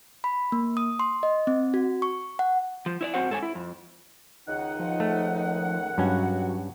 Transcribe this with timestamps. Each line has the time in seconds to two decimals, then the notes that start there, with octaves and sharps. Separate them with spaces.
0.24 B5
0.52 A#3
0.77 D#6
0.99 C6
1.23 D#5
1.47 C4
1.74 F#4
2.02 C#6
2.39 F#5
2.86 F3
3.01 E4 C#5 D5
3.14 F#2 C4 F#4 C5 F#5
3.30 G#2 A4 C#5 G#5
3.43 E4
3.55 F2
4.48 C#2 D#3 D#4 F#5
4.80 F3
5.00 A3
5.98 G2 F#3 C#4 F#4